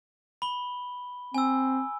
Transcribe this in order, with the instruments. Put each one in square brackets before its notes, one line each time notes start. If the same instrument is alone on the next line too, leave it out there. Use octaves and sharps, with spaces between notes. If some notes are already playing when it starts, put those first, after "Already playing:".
[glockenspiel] B5 G7
[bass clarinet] C4 [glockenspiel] G#5 E6